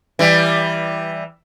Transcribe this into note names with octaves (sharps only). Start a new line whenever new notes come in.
E3 G3